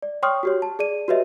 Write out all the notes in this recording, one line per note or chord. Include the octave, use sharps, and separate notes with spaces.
D5
C#5 G5 C6 C#6 D#6 F6
F#4 G4 C#5
A5
G#4 D5 D#7
F#4 G4 B4 C#5 D#5 E5